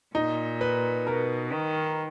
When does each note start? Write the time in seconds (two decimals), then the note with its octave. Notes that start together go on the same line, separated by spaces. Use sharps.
0.15 A#2 D#4
0.61 B4
1.07 B2 A#4
1.53 D#3